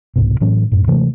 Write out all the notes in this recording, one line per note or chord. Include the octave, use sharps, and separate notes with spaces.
C2 G#2 B2
A2 E3 F#3 C#4
F#2 A2
C3 E3 G#3 A3